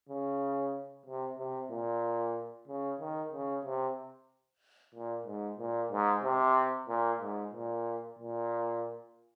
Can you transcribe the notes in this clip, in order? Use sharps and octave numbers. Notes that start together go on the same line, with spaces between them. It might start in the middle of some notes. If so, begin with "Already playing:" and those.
C#3
C3
C3
A#2
C#3
D#3
C#3
C3
A#2
G#2
A#2
G#2
C3
A#2
G#2
A#2
A#2